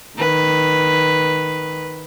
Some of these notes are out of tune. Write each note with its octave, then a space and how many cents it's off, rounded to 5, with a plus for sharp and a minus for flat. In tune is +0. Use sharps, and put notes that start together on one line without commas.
D#3 +0 B4 +0